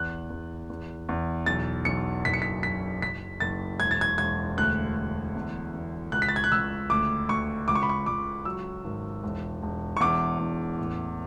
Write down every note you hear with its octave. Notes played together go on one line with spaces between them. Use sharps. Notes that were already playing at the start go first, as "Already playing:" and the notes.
Already playing: E2 F#6
E2
E2
E2
B1 A6
B1 C#7
F#1 B6
C#7
B6
F#1 B6
F#1 B6
F#1 A6
E1 G#6
A6
G#6
E1 G#6
D2 F#6
D2
E2
E2
C#2 F#6
B6
A6
G#6
F#6
C#2 E6
D2 D6
D2 C#6
C#2 D6
C#6
B5
C#6
C#2 D6
F#3 E6
G#1
E1
E1
C#6
E2 D6
E2
A1